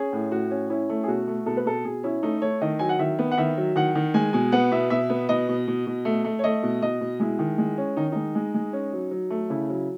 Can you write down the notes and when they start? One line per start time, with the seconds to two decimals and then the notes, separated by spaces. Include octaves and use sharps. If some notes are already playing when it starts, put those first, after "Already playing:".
Already playing: C#4 G#4
0.13 A2
0.31 A2 F#4
0.51 C#4
0.70 C#4 E4
0.90 A3
1.03 G#4
1.08 B2 F#4
1.27 A3
1.46 B2 A4
1.57 B4
1.65 B2 A4
1.85 B2 G#4
2.03 C#4 E4
2.23 A3 D#4
2.42 A3 C#5
2.61 D#3 D#5
2.79 F#3 G#5
2.89 F#5
2.99 D#3 E5
3.19 B3
3.31 F#5
3.38 D#3 E5
3.58 F#3
3.76 D#3 F#5
3.95 D#3
4.14 G#3 G#5
4.33 B2 G#5
4.52 B3 F#5
4.72 B2 E5
4.90 B2 E5
5.10 B3
5.29 B2 D#5
5.49 B2
5.68 B2
5.87 B2
6.05 A3
6.24 A3
6.39 C#5
6.44 A3 D#5
6.63 B2
6.82 B2 D#5
7.01 B2
7.20 G#3 E4
7.39 D#3
7.58 G#3
7.78 C#4
7.97 D#3 D#4
8.12 G#3 D#4
8.35 G#3
8.54 G#3
8.73 C#4
8.93 F#3
9.11 F#3
9.30 A3
9.50 C#3 E4
9.69 F#3